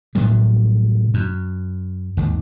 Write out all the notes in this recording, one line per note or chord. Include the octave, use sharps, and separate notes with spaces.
A2 C3 F#3 G3
F#2
G#1 D#2